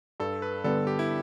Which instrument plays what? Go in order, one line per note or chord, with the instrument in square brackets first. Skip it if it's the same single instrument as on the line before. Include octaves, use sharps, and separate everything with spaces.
[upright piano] G2 [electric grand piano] A4
[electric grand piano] B4
[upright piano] D3 G3 B3 [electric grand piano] A4
[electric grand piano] G4
E4